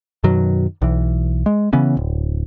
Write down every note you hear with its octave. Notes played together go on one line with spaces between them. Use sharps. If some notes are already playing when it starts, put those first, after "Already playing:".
F#2 B2 D#3 F#3
B1 E3
G#3
C#3 E3 B3 C#4
D1